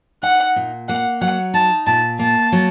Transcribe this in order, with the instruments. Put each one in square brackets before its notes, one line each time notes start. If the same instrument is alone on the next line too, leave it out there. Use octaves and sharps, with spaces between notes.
[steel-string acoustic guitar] D#4 [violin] F#5
[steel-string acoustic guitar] A#2
[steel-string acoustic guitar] A#3 [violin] F#5
[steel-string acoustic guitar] F#3 [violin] F#5
[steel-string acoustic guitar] D#4 [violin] A5
[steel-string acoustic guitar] A#2 [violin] A5
[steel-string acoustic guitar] A#3 [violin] A5
[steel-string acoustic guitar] F#3